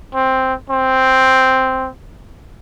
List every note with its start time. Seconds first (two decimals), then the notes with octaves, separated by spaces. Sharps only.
0.14 C4
0.70 C4